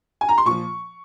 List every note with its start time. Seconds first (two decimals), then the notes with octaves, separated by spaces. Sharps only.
0.21 G#5
0.29 A#5
0.38 C6
0.45 A#2 F3 C#6